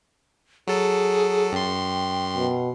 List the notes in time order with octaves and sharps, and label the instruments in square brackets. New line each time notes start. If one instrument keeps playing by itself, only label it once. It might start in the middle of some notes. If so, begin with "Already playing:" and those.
[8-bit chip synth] F#3 A4 [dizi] G#4
[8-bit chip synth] F#2 C6 [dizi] G5
[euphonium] B2